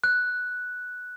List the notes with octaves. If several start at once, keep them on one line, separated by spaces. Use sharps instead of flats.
F#6